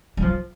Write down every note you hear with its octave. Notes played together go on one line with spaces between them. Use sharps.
G3
F3